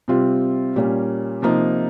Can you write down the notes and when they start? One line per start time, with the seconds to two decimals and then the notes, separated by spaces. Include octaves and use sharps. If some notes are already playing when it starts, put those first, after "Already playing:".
0.08 C3 G3 C4 F4
0.76 A#2 G3 A#3 C#4
1.42 C3 F3 A#3 D#4